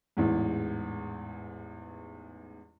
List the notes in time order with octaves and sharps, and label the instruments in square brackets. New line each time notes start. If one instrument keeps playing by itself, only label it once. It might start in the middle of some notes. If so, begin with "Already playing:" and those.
[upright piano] A1 E2 G#2